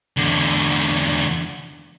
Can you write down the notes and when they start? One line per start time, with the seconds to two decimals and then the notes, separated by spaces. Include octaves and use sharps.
0.17 E2 D3